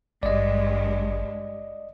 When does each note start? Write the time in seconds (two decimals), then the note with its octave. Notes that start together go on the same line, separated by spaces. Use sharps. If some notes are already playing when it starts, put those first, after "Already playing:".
0.23 G#1 G2 G#3 D5 D#5